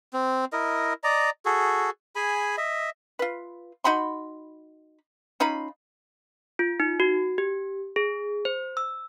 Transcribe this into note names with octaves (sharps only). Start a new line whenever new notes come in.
C4
E4 A#4 D#5
D5 D#5 A#5
F#4 G#4 A4
G#4 G#5 B5
D#5 E5
F4 B4
D#4 F#4 B5 C6
C#4 D#4 F4 B5
F4
D#4
F#4
G4
G#4
C5
E6